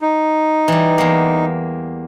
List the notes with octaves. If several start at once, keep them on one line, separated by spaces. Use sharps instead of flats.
D#4
E3 G3
E2 A#3